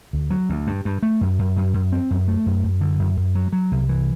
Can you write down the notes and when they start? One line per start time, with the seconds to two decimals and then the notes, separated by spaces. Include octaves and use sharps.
0.13 D2
0.30 F#3
0.50 D2
0.67 G2
0.85 G2
1.03 A3
1.21 F#2
1.39 F#2
1.56 F#2
1.74 F#2
1.92 C4
2.11 F#2
2.28 A3
2.46 F#2
2.64 F#2
2.81 D3
2.99 F#2
3.17 F#2
3.35 F#3
3.53 F#3
3.72 C2
3.89 E3